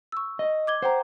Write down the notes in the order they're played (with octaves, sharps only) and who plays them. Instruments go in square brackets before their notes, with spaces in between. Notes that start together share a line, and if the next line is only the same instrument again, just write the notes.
[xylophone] C#6 E6
[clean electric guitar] D#5
[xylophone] D6 G#6 G7
[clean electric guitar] C5 [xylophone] F#5 G5 A#5